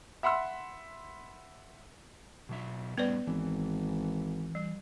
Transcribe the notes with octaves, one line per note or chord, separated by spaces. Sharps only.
E5 F#5 B5 C6 E6
B2 F#3 E5
A2 G3 B3 B4 D5
G#1 E3
G3